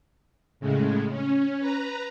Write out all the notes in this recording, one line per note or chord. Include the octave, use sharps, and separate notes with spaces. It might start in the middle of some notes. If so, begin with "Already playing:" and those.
A2 C#3 G#3
C#4
B4 A#5